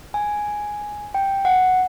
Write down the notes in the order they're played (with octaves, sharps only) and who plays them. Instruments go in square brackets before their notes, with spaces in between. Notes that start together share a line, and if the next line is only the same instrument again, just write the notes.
[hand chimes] G#5
G5
F#5